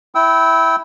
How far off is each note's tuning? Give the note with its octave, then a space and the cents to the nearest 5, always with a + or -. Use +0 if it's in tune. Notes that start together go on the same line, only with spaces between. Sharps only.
E4 +0 G5 -20 E6 -25